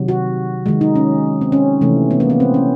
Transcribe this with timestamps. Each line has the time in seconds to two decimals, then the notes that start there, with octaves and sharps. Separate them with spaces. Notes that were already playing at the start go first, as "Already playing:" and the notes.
Already playing: C3 D#3 F#3
0.08 F#4
0.66 D#3 G#3
0.81 D#4
0.96 C#4
1.41 C4
1.52 C#4
1.81 C3 E3 A3
2.11 B3
2.20 A#3
2.30 B3
2.40 C4
2.54 C#4